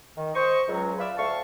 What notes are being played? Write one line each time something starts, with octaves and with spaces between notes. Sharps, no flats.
D#3
C5 D#5 C#6
C#2 F#3
F4 B4 D5 E5
D2 A3 F5 A5 C#6